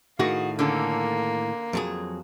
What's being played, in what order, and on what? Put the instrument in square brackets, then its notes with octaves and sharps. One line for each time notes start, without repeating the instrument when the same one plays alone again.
[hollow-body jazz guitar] A2 D#3 G#4 [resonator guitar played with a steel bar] F#4 [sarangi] F5
[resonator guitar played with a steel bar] D3 C#4 A4 [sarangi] A#3
[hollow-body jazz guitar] F2 F#3 G#4